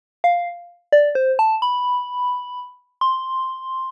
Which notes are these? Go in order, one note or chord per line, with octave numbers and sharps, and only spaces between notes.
F5
D5
C5
A5
B5
C6